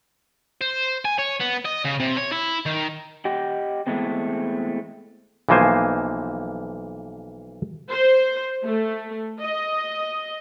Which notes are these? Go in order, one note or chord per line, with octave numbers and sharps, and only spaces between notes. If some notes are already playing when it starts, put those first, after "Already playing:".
C5
G#5
C#5
B3
D#5
C#3
C3
C#5
E4
D#3
G4 D#5 F#5 G5
E3 G#3 A3 B3 C4
B1 E3 F3 A#3 C5 G#5
C5
A3
D#5